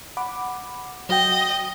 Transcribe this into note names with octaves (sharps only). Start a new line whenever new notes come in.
F#5 B5 D6
F#3 F#4 D#5 G5